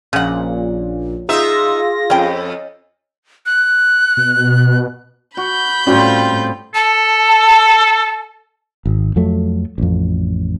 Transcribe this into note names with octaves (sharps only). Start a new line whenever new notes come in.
A#1 A#2 C#3 F#5
D#4 F4 G#4 E5 A#6
F2 C#4 G5
F#6
B2
F#4 B5 G6
A2 G3 C4 C#4 F4 F#4
A4 A5
G#1
F2 F#3 A3
A1 F2